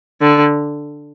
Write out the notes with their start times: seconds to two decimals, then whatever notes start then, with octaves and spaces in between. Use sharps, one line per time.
0.21 D3